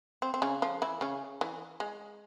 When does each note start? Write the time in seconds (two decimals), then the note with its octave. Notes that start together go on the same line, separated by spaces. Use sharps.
0.22 C4
0.34 C4
0.42 C#3 C#4
0.62 F3 F4
0.82 E3 E4
1.01 C#3 C#4
1.41 E3
1.80 G#3